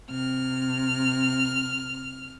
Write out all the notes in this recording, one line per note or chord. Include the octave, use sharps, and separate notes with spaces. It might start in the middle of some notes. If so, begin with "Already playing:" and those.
C3 F6